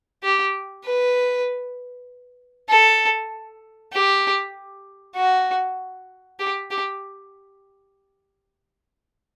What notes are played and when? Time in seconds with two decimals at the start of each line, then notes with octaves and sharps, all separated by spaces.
0.24 G4
0.85 B4
2.70 A4
3.93 G4
5.16 F#4
6.40 G4
6.71 G4